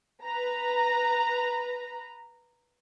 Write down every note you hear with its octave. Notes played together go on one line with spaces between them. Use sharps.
B4 A#5